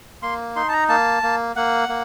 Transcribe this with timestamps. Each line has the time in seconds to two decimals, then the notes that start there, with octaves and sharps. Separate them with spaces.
0.22 A#3 C6
0.56 D#4 C6
0.68 A5
0.72 A#5
0.89 A#3 A5
1.23 A#3
1.56 A#3 F#5
1.89 A#3